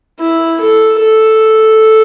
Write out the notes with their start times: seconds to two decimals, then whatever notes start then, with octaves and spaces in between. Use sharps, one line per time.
0.20 E4
0.61 A4
1.00 A4